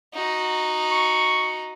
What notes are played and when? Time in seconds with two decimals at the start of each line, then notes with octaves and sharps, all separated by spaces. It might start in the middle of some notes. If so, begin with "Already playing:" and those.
0.13 D#4 F#4
0.91 C#6